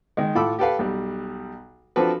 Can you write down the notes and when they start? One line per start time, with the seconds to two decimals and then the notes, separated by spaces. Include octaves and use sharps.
0.17 D#3 G#3
0.35 A2 F4 A4 B5 D6 E6
0.59 G4 A4 B4 F5
0.79 B1 G3
1.96 F3 C4 D4 F#4 A4 B4